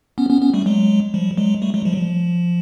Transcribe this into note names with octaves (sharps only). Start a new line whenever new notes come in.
B3 C#4
B3 C#4
B3 C#4
G3 A3
F#3 G#3
F3 G3
F#3 G#3
G3 A3
F#3 G#3
F3 G3
F#3
F3